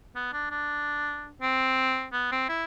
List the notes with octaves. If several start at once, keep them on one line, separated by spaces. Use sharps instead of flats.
B3
D4
D4
C4
B3
C4
E4